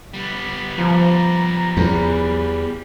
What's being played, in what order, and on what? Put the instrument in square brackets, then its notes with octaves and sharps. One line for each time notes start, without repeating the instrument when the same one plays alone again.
[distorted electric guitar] G3 B3
[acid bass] F3 [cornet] A#5
[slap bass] E2